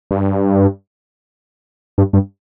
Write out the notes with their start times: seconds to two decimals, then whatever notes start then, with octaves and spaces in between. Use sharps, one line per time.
0.11 G2
1.98 G2
2.13 G2